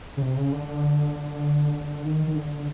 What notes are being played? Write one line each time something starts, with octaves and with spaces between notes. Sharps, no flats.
C#3
C3
C#3
D3
D3
D#3
D#3
D3